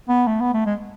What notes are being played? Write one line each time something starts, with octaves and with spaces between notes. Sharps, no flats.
B3
A3
B3
A3
G#3